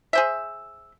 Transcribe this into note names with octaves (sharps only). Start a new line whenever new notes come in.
G#4 C5 E5